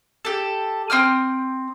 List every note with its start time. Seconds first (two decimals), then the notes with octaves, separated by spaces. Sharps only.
0.25 G4 A4
0.90 C4 G5 D#6 F6